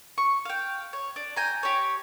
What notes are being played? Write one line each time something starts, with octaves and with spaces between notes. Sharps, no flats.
C#6
F5 G5
C#5
D4
G5 G#5 A#5
G4 C#5